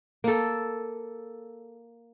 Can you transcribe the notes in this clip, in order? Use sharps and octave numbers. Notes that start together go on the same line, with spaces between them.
A#3 A4